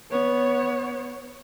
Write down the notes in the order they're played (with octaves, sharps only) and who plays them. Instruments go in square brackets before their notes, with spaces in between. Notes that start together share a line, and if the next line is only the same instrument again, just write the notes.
[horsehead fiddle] B3 C#5